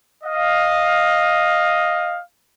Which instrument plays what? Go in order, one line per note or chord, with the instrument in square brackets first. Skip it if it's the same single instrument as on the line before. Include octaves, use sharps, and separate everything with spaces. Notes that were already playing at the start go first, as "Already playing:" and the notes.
[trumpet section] D#5 F5